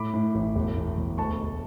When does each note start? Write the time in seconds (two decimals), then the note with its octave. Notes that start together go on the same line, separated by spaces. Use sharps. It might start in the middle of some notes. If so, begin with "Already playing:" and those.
Already playing: A2 B5 D6
0.14 A2
0.34 A1
0.56 E1
0.77 E2
0.97 E1
1.18 D2 A5 C#6
1.39 D2